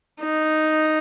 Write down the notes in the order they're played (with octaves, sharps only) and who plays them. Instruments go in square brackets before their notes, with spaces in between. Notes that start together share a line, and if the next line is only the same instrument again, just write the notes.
[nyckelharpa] D#4